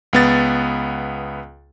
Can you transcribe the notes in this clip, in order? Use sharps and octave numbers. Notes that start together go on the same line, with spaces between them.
C#2 B3 A6